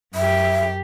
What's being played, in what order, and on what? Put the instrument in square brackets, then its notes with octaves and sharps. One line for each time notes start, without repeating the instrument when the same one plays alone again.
[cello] F#2 G4 [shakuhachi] E5